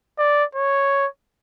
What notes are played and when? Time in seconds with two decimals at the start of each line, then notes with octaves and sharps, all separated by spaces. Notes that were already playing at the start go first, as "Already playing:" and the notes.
0.18 D5
0.55 C#5